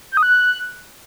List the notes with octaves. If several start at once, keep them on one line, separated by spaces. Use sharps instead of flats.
G6
D#6
F#6